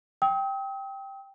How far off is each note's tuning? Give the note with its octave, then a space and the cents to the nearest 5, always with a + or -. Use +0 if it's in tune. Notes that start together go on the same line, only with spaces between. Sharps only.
G5 +0 D#6 +45